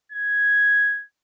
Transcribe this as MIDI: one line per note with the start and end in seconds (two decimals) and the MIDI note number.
0.12 1.03 92